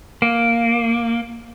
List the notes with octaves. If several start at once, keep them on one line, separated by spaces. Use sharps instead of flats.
A#3